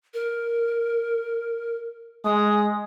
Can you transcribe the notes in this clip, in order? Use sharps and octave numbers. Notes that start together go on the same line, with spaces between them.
A#4
G#3 D#6